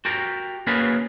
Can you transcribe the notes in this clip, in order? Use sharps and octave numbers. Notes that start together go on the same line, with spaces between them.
F#4 G4 A#4
A#3 C#4 F#4 G#4 A#4 B4